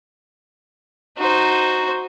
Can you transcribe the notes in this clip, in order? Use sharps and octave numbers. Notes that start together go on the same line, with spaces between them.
D#4 F#4 C5